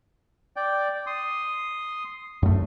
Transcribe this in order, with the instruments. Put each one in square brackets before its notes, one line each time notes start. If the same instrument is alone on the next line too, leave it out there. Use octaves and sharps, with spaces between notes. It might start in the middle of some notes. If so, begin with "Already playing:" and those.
[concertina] D5 G5
C6 D#6
[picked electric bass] F#2 A3